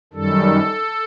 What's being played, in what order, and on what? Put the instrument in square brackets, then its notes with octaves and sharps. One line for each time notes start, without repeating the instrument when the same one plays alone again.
[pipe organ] F#2 D#3 G3 A4